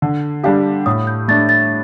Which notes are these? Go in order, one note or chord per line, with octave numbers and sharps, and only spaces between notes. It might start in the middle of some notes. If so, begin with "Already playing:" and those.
D3
G3 D4 G4 F5
A2 D#6
G6
A3 D4 A6
A6